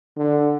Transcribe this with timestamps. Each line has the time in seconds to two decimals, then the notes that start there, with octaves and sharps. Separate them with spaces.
0.16 D3